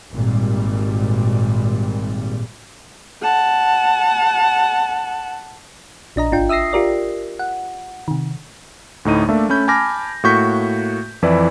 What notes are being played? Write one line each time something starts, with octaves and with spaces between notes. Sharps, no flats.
G#1 A#2 G3
F#5 A5
A#1 D4 D#5 A#5
G#1 D4 F4 G5
E5 D#6 E6 A#6 C7
F4 G4 A#4 D5
F#5
C3 D#3
D2 A2 D#4 D#7
A3 A#3 D4 E5
A3 C#4 B5 G6
G#5 A5 B5 D6 F6 A#6
A2 A#3 F#4 C#6 G6 B6
F2 E3 E4 B4 D5